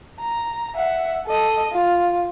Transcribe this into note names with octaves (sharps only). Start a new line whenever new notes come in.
A#5
E5 F#5
A4 D#5
F4